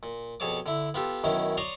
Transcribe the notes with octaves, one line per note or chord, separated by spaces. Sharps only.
A#2
F2 B2 G#4 C#5 A5 D6
D3 E4
B3 F4 G4 A4
F#2 B2 D#3 C#4 E4
C#5 D5 A#5 C6 C#6 D#6